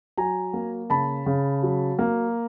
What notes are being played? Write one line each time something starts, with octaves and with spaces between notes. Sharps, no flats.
F#3 G#5 A#5
A#3
C#3 A5 B5
C#3
F#3
A#3